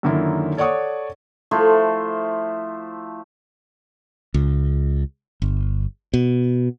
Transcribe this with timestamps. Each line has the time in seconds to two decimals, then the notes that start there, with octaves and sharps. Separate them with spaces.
0.03 F#2 D3 D#3 A#3 E4
0.57 A4 C#5 D5 F#5 C#6 D#6
1.51 F3 A3 E4 C5
4.34 C#2
5.42 G1
6.14 B2